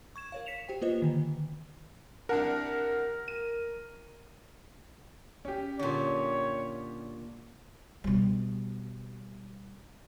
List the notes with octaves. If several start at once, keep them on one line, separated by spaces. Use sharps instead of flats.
C#6 G#6 E7
A#4 C#5 F5
B6 C#7 E7 F7
G4 C5 G5
A#3 F4 B4 C5 D#5
D3 D#3
C2 D4 A#4 F#5
D#7
C#4 G4
A#2 D3 C#5
B2 G3